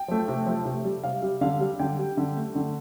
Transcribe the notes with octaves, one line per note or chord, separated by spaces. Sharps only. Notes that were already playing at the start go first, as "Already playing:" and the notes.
Already playing: G5
F3 A3
C3
F3 A3
C3
G3
C3 F5
G3
D3 F5
G3
D3 G5
G3
D3
A3
D3